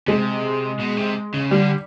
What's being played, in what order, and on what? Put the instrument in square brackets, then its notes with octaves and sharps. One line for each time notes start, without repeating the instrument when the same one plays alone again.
[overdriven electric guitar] C3 [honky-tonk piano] G#3
[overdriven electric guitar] B2
C3
C#3
[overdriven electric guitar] D3 [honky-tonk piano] G3